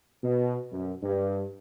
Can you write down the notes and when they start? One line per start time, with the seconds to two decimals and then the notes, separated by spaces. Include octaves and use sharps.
0.23 B2
0.72 F#2
1.03 G2